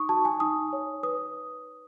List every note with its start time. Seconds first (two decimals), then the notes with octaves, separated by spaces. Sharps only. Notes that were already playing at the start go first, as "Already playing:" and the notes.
Already playing: D#4 C#6 D#6
0.09 F#4 A5
0.25 G#5
0.40 D#4 D#6
0.73 C#5
1.03 B4 D#6